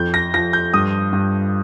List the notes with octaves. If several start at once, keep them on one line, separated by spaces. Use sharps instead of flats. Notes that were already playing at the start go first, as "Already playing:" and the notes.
Already playing: F2 G6
A#6
F3 A#6
G6
G2 D#6
G2